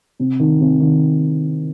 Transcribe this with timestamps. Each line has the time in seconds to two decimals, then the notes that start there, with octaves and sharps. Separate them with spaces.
0.20 C3
0.40 D#3
0.60 C3
0.80 D#3